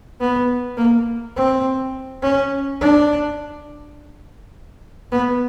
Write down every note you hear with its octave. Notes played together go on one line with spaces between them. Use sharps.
B3
A#3
C4
C#4
D4
B3